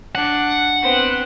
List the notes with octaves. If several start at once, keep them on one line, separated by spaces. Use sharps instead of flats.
D4 F#5
B3 C4